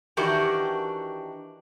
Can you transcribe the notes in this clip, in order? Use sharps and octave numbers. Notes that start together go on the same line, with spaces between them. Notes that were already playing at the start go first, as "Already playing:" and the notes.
D#3 E3 D4 F#4 G4 A#4